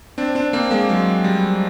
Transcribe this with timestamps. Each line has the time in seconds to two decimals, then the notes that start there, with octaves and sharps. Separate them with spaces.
0.18 C4 D4
0.35 C4 D4
0.53 A#3 C4
0.71 G#3 A#3
0.89 F#3 G#3
1.24 G3